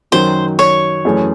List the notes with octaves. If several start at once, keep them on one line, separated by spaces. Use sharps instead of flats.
F#2 D#3 F#3 C5
C#5
F#2 E3 A3 C#4 G#4